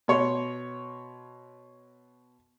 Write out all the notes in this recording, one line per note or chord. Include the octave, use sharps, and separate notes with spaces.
B2 C#5 C6